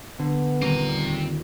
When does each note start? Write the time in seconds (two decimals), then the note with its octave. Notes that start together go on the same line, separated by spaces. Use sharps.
0.19 D3 B3
0.62 D#1 C4 A#5 D6 D#7